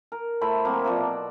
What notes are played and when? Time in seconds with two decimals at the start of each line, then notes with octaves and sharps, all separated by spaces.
0.12 A#4
0.41 A3 E4 C5 B5
0.65 F#3 A#3 C4
0.85 C3 F3 F#3 D5
0.97 B2